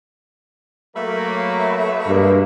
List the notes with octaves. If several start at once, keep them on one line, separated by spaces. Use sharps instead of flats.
F#3 A3 A#3 B4 E5
G2 B2 G#3 A#3